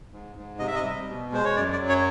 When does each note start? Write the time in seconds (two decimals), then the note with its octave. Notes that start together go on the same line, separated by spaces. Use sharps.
0.12 G#2
0.36 G#2
0.59 C3 D#5
0.67 E5
0.75 D#5
0.83 G3
1.08 B2
1.32 G#3 C5
1.45 C#5
1.56 F#2 D5
1.72 D5
1.79 F#3
1.89 C#5